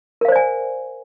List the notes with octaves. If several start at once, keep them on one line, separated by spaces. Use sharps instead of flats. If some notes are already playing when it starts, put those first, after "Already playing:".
A#4 C5 D5 F5 G#5